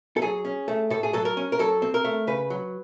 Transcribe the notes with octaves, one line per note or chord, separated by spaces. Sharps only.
A4
F#3 G#4
C#4
A3
A2 A4
G#4
F#3 A4
A#4
C#4
A#4
F#3 A4
C4
A#4
A3
C#3 B4
F#3